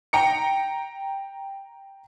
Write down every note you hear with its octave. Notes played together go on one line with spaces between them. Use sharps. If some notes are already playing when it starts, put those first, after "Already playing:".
G5 A#5 C#7